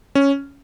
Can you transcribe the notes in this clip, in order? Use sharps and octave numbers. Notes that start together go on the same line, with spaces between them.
C#4